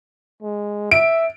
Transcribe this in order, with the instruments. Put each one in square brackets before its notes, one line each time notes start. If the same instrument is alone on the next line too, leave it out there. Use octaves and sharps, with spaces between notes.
[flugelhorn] G#3
[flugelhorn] E5 [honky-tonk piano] D7